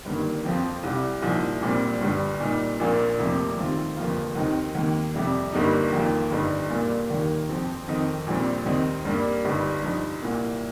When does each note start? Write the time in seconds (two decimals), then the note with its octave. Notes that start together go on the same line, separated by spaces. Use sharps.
0.05 G1 G2 D#3 A#3
0.45 F2 F3 C4 F4
0.83 C2 C3 G3
1.22 C2 A#2 F3 D#4
1.62 A#1 A#2 G3 C4
2.01 G1 G2 G3
2.40 A#2 G3 D#4
2.80 A#1 A#2 A#3 F4
3.18 F1 F2 C3 F3 A#3
3.57 D#2 D#3 C4 F4
3.97 G1 F2 F3 A#3 F4
4.36 D#2 D#3 C4 D#4
4.75 D#2 D#3 A#3
5.14 F2 C3 G3
5.53 G1 G2 G3 A#3 D#4
5.92 F2 D#3 A#3 F4
6.31 G1 G2 G3 D#4
6.70 A#2 G3 A#3 F4
7.10 D#2 D#3 A#3
7.49 F2 F3 C4
7.87 F2 D#3 C4 D#4
8.26 A#1 A#2 G3 C4
8.66 D#2 D#3 C4 D#4
9.05 G2 G3 A#3
9.44 G1 G2 G3 D#4
9.83 G2 F3 D#4
10.22 C2 A#2 A#3